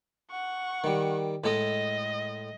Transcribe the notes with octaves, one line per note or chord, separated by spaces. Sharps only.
F#5 C#6
D#3 G3
A2 G#3 A4 D#5